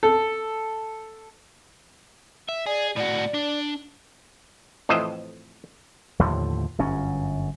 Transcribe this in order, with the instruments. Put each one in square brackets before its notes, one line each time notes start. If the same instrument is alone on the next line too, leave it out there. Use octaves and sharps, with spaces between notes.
[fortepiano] A4
[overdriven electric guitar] E5
[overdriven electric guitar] G#4 [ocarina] D5
[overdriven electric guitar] A2 F#4 [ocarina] D5
[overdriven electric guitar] D4
[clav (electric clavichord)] F2 A2 E3 C5 D#5 E5
[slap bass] D#2 A2 D3 F3
G1 F#2 C#4